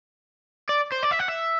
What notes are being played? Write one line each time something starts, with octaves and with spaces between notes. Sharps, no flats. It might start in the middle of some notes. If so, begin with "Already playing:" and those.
D5
C5
D5
E5
F#5
E5